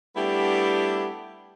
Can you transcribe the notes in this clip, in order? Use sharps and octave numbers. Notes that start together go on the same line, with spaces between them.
G3 A3 B3 D4 E4 G4